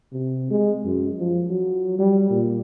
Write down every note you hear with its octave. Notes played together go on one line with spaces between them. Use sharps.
C3
G#3
F#2
F3
F#3
G3
A#2